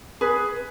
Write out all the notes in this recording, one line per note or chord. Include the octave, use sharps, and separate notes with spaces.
G#4 B4